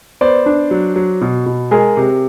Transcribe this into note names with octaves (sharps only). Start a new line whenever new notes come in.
B3 C5 D5
D4
F#3
F#3
B2
B2
G#3 G#4 A#4
C3